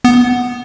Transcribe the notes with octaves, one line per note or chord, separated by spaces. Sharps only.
B3